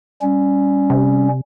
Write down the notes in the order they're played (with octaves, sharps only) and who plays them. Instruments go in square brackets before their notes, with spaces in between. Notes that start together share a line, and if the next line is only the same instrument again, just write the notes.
[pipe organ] G3 C#4
[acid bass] C3